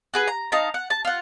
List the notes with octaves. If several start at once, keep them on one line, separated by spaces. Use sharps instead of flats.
F#4 G#4 B4
A#5
D#4 F5 A5 A#5
F#5
A5
F4 F#5